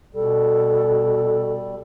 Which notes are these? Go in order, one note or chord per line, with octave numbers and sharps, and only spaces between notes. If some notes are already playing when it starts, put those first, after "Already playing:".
B2 G3 A4